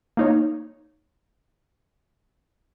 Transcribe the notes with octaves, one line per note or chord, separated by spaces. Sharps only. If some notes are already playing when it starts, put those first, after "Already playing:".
A#3 D#4 C#5